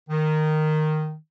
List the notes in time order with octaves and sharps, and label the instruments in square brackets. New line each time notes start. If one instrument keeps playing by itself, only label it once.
[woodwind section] D#3